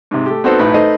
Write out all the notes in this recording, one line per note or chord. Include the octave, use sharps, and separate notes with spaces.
G#2 C3
A3 G4
B3 C4 D#4 F#4 A4 C5
B1 A2 D#4 B4 B5
A3 D#4 B4 C5 D#5